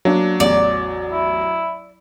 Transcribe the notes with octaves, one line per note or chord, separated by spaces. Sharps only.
F#3 A#3 D4 D5
A1 E2 D5
E4